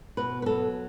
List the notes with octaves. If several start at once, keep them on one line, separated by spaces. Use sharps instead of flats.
B2 B4
B4
F#3 A4